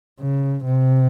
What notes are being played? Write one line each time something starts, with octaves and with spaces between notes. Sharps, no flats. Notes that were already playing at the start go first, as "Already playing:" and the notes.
C#3
C3